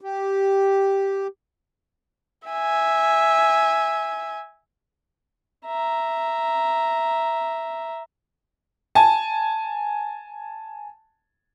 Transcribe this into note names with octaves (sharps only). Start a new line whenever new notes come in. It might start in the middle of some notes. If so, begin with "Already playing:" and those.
G4
E5 G#5
E5 A#5
G#5 A5